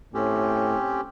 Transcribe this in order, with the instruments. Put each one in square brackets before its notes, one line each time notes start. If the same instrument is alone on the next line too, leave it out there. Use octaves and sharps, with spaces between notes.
[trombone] A2 [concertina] C4 C#4 G4